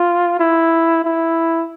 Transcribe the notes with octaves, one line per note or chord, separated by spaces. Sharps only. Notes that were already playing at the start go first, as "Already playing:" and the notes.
Already playing: F4
E4
E4